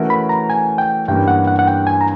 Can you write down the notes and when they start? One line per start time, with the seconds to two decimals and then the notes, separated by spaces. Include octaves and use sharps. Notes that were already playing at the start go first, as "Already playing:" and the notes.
Already playing: E3 A3 C#4 F#4 A#4
0.10 B5
0.29 A#5
0.50 G#5
0.78 G5
1.08 G2 E3 G3 A#3 C#4 G5
1.28 F#5
1.47 F#5
1.59 F#5
1.67 G5
1.87 G#5
2.01 A#5